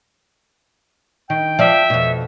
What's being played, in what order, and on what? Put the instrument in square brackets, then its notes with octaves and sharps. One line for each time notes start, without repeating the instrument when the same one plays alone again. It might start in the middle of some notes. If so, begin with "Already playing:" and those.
[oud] D#3 [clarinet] G5
[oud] F3 D5 [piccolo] E5
[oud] F2 B2